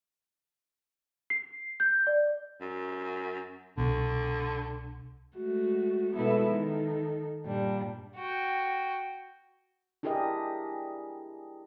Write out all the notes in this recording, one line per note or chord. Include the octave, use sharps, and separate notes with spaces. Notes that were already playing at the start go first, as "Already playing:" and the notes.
C7
G6
D5
F#2
C2 B2 D3
G#3 A3 F#4
B2 G#3 B3 E4 A4 B4
D#3 A4
G2 A#2 G3 D4
F#4 G5
D4 E4 G4 G#4 A#4 D#5